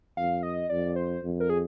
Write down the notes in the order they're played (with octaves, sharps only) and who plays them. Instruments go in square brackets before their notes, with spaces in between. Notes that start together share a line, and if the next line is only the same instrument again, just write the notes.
[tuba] F2 [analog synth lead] F5
[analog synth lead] D#5
[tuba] F2 [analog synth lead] D5
[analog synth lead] C5
[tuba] F2
[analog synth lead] A#4
G#4